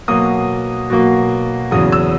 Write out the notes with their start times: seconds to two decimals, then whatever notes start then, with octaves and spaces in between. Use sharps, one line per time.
0.08 B2 F#3 A#3 D#6
0.90 B2 F#3 A#3
1.71 E2 C#3 F#3 D#6
1.92 E6